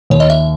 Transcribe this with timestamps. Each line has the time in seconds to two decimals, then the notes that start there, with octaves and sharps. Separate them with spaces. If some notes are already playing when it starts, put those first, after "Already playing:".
0.10 D#2 C#5
0.20 D#5
0.30 E5